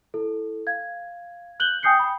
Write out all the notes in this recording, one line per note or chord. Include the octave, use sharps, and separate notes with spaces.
E4 A4
F5 G#6
F#6 G6 F#7 G7
G5 G#5 D#6 G6 C7 C#7
B5